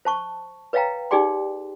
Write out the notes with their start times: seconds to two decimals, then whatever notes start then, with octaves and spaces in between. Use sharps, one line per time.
0.05 C5 A5 C#6
0.73 B4 C#5 D#5 F5 G5 A#5
1.11 D#4 G4 G#4 D5 G5 C6